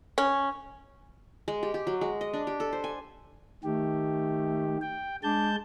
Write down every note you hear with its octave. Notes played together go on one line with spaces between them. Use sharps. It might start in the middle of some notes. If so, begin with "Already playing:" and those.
C#4
G#3
G4
G4
F#3
G#3
D#5
D4
G4
A4
C5
G#5
D#3 A3 G4
G5
G#3 D4 A5 G6